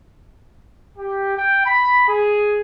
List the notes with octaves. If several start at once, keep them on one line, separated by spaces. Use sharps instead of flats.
G4
G5
B5
G#4